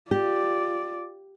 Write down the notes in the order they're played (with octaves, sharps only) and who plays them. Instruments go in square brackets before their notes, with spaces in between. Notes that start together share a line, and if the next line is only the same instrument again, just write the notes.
[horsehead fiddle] F4 D5 [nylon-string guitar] G4